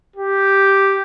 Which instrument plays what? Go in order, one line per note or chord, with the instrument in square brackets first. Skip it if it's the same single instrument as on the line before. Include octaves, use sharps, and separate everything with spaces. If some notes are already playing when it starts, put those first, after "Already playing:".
[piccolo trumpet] G4